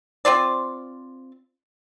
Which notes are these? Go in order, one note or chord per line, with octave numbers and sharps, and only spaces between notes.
C4 F4 C5 D5